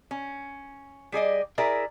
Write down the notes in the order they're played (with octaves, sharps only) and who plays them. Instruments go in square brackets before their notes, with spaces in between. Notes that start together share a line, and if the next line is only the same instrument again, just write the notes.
[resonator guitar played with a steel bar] C#4
G3 G#4 D5 D#5
E4 G#4 A#4 D5 E5